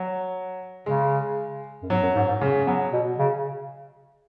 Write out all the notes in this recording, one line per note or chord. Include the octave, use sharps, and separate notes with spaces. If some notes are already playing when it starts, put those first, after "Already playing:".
Already playing: F#3
C#3 G#3
F#2
G#2 F#3
F#2
G#2
G#2
C#3
F#3 B3
B2
C#3